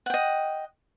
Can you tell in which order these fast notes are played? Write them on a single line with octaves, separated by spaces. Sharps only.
F#5 G5 D#5